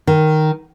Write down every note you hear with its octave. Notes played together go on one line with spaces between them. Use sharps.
D#3